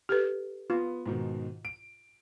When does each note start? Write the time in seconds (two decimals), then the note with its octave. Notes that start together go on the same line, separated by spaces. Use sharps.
0.09 G4 A4 B4
0.70 B3 F4
1.06 G#2 B2 D#3
1.65 D7